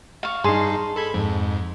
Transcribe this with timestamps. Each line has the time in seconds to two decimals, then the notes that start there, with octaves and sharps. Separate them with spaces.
0.23 F5 C#6
0.44 G2 D#4 G#4 A5 C6
0.96 A4 B5 G#6
1.14 F2 G#2